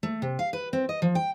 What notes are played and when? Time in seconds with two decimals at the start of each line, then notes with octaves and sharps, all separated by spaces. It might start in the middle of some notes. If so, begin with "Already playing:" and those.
0.03 A3
0.22 C3
0.39 F5
0.53 B4
0.73 C4
0.89 D#5
1.02 F3
1.15 G5